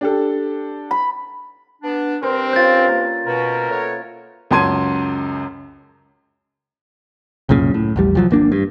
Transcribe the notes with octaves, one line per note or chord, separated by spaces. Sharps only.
D4 G4 A4
B5
B3 D4
G2 C4 A#4 C5
C#4 F4 G6 A6
A#3
B2 A#4
A3 B3 C#5
C#2 F#2 A5 C6 G#6 D#7
C2 F#2 A#2 C#3
A2
A#1 E2 G3
C2 F3 F#3
G#1 A#3 D4
G2